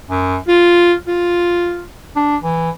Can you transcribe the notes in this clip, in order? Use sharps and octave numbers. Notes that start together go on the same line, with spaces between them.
F#2
F4
F4
D4
E3